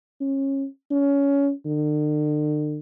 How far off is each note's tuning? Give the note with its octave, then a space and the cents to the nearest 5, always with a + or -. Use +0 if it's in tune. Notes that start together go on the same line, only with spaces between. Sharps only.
C#4 -25
C#4 +20
D3 +45